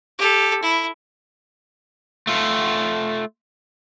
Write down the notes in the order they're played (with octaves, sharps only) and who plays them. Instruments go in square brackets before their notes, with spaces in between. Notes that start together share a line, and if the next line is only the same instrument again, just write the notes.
[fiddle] G4 A4
E4
[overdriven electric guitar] A3 F4